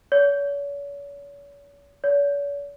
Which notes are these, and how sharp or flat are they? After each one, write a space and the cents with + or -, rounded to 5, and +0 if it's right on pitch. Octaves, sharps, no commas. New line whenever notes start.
C#5 +40
C#5 +45